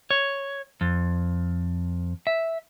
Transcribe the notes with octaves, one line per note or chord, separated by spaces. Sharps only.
C#5
F2
E5